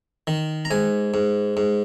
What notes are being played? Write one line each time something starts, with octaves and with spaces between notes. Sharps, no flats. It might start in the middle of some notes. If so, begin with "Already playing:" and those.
D#3
A#5
G#2 G#5
G#2
G#2